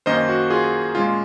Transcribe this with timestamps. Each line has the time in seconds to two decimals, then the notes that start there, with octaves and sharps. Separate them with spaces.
0.06 F#2 D#3 A#3 C#4 C5 D#5
0.29 F#4
0.50 F4 G#4
0.95 A#2 G#3 C#4 F4